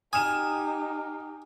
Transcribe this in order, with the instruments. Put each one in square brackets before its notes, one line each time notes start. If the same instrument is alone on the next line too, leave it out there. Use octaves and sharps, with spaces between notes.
[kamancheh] D#4 G4 [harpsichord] G#5 [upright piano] D#6 F6 E7